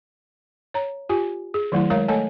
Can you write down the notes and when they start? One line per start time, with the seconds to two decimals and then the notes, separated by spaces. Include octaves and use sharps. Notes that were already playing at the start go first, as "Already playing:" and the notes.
0.74 C#5 A#5
1.09 F4 G4 G#5
1.54 G#4
1.72 D#3 F#3 A3 E4
1.90 G#3 A#4 C#5 F5 A#5
2.08 A3 A4 C#5 D#5 G#5 A5